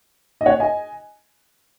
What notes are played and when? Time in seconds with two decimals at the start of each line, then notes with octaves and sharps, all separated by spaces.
0.41 D#5
0.46 C#5 F#5
0.60 D#5 G#5